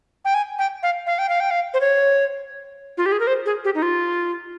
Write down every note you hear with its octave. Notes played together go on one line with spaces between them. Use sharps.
G5
G#5
G5
F5
F5
G5
F5
G5
F5
C5
C#5
F4
G4
G#4
A#4
C5
G#4
G4
D#4
F4